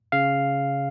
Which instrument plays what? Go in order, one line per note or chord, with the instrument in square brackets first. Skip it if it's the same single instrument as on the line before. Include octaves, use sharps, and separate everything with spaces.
[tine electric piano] C#3 F5